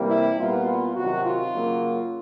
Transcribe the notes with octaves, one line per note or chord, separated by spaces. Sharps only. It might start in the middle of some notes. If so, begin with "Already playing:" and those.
Already playing: C3 E3 G3 A#3
E4
A#2 G3 B3 F4
F4
C3 D#3 F#3 F#4
F4
C#3 F#3 A#3